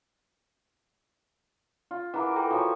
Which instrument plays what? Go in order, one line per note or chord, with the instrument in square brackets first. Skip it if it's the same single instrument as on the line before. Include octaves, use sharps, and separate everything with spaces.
[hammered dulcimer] F4
[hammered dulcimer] E3 A#4 [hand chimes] F#5 A#5 D6
[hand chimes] A4 G5 A#5
[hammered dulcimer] F3 C#5 G#5 [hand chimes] F#4